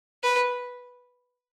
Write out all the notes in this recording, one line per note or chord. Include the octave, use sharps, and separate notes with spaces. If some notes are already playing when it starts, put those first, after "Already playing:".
B4